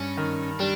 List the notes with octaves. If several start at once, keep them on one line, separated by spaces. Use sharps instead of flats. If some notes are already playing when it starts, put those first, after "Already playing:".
Already playing: G2 C#4
D#3
G3 D4